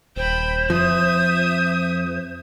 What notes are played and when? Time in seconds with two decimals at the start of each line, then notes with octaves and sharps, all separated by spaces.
0.16 D#1 C5 G5 B5
0.70 F2 F3 E5 D#6